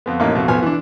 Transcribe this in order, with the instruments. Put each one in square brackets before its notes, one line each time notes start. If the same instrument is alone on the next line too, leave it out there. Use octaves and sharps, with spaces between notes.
[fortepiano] F2 B3
A1 A2 A#3 D#4
F2 B2
B1 F3 B3 G#5 F6
E3 D4